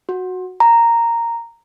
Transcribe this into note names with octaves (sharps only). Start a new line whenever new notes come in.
F#4
A#5